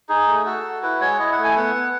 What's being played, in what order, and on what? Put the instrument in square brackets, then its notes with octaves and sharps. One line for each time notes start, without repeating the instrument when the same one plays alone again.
[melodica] D#4 G#4
A3
F#4 A4
F#4
E4 B4
G#3 C#5
E4 D#5
F#5
A3
G#5
B3 F#5
B3